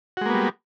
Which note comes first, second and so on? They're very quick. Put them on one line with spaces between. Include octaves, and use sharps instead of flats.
F#4 G#3 A#3 B3 G3